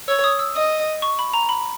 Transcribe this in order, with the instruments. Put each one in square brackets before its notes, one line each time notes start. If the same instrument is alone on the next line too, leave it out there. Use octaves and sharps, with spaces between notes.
[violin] C#5 [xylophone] E6
[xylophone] D#6
E6
[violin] D#5 [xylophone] D#6
[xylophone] C#6
B5
A#5
B5